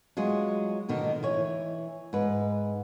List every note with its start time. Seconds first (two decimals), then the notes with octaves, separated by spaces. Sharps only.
0.17 F#3 G#3 F4 G#4
0.89 B2 D3 D#3
1.23 E3 C#5
2.13 G#2 B4